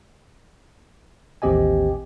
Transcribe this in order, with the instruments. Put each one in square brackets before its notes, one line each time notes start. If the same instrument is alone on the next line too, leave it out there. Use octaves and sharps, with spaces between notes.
[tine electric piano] A1 D#2 C4 G4 D#5 G#5